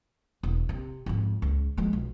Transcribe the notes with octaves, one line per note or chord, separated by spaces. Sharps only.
E1
C3
F2 G#2
C#2
F3 G#3
B1